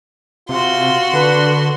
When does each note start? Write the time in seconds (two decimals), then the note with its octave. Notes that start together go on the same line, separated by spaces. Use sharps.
0.49 C3 F4 F#4 C6
1.13 D3 D4 B4